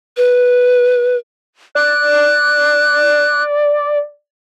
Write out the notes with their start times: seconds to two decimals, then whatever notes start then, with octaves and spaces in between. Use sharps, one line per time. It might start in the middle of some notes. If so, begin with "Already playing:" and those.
0.17 B4
1.75 D5 F#6